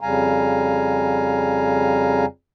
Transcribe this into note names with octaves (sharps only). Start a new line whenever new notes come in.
F2 C#3 G3 F5 G#5 A#5